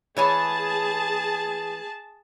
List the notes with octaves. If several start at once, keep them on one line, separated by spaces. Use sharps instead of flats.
E3 G#4 C#5 G#5 A5